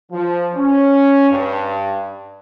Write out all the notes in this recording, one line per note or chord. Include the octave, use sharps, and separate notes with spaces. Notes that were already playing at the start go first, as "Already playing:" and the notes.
F3
C#4
G2